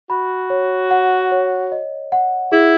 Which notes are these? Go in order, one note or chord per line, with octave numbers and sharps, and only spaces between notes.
F#4 B5
C#5
F#5
C#5
D#5
F#5
E4 G#4